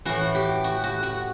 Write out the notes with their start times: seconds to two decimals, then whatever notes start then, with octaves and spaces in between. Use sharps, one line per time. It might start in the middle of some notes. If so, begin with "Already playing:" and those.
0.05 A2 E3 F#4
0.35 G4
0.64 F#4
0.84 F#4
1.03 F#4